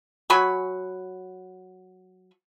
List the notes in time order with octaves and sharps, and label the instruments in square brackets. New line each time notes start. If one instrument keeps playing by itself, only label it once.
[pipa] F#3 G#5 B5 C#6